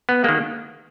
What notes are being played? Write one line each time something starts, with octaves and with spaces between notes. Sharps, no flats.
B3
D#3 G#3 A#3